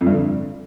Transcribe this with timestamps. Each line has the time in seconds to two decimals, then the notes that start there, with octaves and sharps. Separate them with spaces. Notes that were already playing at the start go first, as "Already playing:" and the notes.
0.01 F2
0.06 G2
0.12 D3